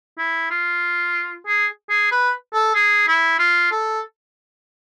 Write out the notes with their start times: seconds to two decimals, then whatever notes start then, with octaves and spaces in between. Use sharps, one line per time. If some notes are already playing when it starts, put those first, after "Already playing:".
0.18 E4
0.50 F4
1.47 G#4
1.89 G#4
2.11 B4
2.53 A4
2.75 G#4
3.07 E4
3.39 F4
3.71 A4